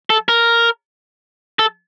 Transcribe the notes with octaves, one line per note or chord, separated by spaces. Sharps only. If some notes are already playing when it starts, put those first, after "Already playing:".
A4
A#4
A4